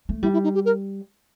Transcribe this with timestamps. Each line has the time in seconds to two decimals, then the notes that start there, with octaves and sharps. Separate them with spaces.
0.09 A3
0.23 G3 E4
0.33 E4
0.44 D#4
0.54 G4
0.65 A#4